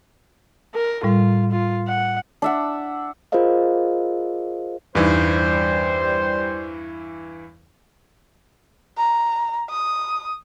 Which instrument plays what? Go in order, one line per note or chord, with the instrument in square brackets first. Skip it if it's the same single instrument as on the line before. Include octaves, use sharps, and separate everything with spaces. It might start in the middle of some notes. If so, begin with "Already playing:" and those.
[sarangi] A#4
[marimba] A2 G3 [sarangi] F4
[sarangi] F4
F#5
[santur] D4 E5 F#5
[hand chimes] F4 G#4 A#4 C5 D#5 F5
[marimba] E2 D#4 [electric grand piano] G2 E3 [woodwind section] G3 C5
[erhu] A#5
D#6